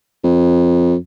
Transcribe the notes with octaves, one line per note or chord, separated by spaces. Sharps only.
F2